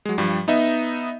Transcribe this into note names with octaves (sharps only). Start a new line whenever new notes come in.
F#3 G#3
G2 F3 G3
B3 D#4 D#5 E5